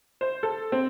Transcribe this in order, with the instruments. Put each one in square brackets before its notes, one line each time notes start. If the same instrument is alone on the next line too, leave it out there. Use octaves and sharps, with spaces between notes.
[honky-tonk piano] C5
A4
C4